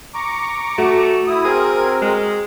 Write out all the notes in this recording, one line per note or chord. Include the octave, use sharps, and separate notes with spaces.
A#5 C#6 D6
A3 F#4
E4 D#6
C4 G#4 A#4
G#3